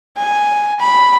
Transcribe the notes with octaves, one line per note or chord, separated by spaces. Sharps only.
G#5
B5